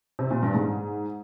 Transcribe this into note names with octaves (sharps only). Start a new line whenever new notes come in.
C3
A#2
G2
G#2